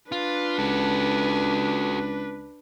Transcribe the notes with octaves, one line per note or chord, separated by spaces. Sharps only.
D4 F4 B4
C#2 F#4 A4